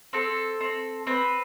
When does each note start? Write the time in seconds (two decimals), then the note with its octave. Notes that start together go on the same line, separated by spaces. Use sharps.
0.13 C4 A4
0.61 C4
1.07 C4 B4